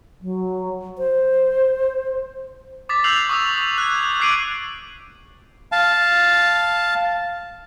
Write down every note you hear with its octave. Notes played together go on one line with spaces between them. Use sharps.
F#3
C5
D6 D#6 A6 B6
E6 F#6 G6 C7 F7 F#7
C#6 D#6 E6
F#6 G#6
G#6
D6 F#6 C7 D7 D#7 F#7
F5 A5